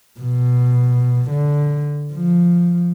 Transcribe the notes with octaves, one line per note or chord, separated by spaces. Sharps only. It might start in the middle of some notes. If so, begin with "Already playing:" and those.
B2
D3
F3